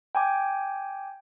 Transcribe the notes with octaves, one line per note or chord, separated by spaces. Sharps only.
G5 G#5 D6